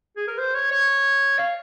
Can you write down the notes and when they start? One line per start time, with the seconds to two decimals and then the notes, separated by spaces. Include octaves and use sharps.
0.17 G#4
0.28 A#4
0.38 C5
0.54 C#5
0.71 C#5
1.38 F5